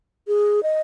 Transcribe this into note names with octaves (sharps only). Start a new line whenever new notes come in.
G#4
D#5